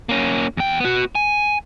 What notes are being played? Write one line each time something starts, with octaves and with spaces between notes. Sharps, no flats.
A#3 C#4
E2 G5
B3 F#4
G#5